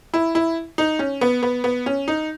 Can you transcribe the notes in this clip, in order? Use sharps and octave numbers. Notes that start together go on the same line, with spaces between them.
E4
E4
D#4
C#4
B3
B3
B3
C#4
D#4